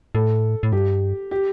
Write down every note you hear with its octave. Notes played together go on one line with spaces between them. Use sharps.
A2 A4
A2
G2 G4
G4